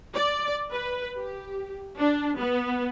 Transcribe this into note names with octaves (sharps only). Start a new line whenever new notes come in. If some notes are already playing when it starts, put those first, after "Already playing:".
D5
B4
G4
D4
B3